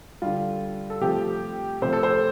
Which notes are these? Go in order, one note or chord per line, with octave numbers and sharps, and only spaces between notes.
D3 G3 F4
A4
C3 F3 A3 G4
C3 F3 A3 C5
A4
C5